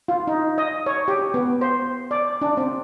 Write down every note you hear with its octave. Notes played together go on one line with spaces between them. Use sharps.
F4
D#4
D#5
C#5
G4
B3
C5
D5
D4
C4